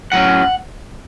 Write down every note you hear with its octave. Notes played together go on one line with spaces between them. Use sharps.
A2 F#3 C#4 F#5